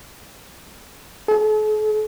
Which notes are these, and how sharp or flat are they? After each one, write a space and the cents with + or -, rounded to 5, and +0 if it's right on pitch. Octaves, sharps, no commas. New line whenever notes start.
A4 -45